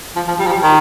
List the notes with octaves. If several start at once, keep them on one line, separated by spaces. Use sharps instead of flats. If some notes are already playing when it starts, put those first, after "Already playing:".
F3
F3
G3
F3
G3
D#3